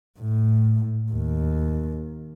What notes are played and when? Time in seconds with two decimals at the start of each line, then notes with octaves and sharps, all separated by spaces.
0.19 A2
1.11 D#2